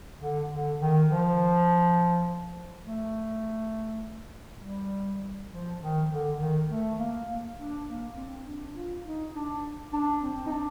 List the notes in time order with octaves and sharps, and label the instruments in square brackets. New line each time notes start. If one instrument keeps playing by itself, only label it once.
[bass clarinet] D3
D3
D#3
F3
A3
G3
F3
D#3
D3
D#3
A3
A#3
A#3
D4
A#3
C4
D4
F4
D#4
D4
D4
C4
D#4
D4